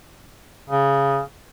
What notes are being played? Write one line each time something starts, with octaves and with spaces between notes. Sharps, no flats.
C#3